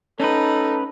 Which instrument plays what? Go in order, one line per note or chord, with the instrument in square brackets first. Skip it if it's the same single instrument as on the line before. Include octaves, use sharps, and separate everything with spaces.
[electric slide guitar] C#4 B4 [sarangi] D#4 [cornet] A4